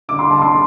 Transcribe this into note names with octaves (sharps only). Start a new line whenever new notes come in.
D3 D6
C6
A5
C6